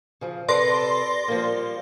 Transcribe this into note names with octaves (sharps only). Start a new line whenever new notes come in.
C#3 F3
C3 A4 B4 D5 C6 A#6
F3 G3 A#3